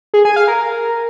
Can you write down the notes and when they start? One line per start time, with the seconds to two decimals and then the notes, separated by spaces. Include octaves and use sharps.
0.14 G#4
0.25 G#5
0.36 F5
0.48 A#4